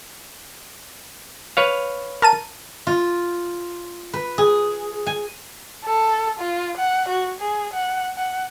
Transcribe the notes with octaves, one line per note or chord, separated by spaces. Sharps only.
B4 C#5 F5
A#4 A5 D#7
F4
B4
G#4
G#5
A4
F4
F#5
F#4
G#4
F#5
F#5